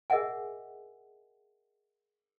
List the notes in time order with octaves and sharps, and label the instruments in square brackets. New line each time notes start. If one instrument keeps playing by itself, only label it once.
[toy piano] G#4 A#4 D#5 E5 F#5 G#5